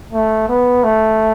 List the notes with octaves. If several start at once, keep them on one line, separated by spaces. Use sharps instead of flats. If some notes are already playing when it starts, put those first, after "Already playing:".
A3
B3
A3